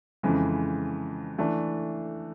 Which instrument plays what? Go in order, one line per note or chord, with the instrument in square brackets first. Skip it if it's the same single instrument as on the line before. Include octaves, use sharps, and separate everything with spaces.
[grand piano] F2 C#3 E3 G#3
E3 A3 D4